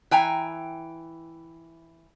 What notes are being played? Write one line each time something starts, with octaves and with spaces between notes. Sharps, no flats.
E3 G5 G#5 A#5